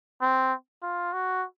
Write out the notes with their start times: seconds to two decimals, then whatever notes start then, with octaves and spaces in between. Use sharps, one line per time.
0.21 C4
0.83 F4
1.13 F#4